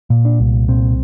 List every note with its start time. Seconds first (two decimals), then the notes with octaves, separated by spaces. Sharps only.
0.10 A#2
0.25 D4
0.40 C2
0.68 A#2 C4